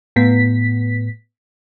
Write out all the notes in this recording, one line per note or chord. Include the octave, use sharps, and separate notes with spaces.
A2 B3 B6